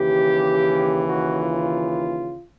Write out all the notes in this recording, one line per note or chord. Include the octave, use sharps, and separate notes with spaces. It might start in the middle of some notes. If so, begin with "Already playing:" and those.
Already playing: D#2 C#3 E3 G4
F#4
F4